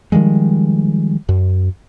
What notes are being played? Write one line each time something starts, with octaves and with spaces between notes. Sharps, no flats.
D#3 F3 G3 G#3
F#2